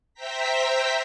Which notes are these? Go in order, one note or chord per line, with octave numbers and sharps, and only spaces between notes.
C5 E5 G5 A#5 B6